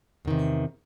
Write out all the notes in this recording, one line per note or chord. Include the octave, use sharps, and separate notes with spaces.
E2 C3 D#3